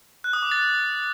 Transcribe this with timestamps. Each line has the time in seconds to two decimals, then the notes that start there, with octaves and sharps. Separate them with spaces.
0.24 F#6
0.33 D#6
0.42 D6
0.51 A6